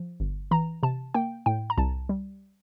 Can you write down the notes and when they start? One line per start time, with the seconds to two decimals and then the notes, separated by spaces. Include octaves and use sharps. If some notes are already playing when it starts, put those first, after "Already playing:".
Already playing: F3
0.20 G1
0.51 E3 A#5
0.83 C3 A5
1.14 A#3 G5
1.46 A2 G5
1.70 A#5
1.78 C2 A5
2.09 G3